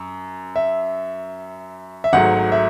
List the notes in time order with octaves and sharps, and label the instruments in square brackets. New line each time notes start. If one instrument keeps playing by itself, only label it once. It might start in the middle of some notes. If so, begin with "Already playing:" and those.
Already playing: [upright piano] F#2
[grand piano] E5
E5
[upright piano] G#1 G#2 F#3 A3 [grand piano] F#5
[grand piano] E5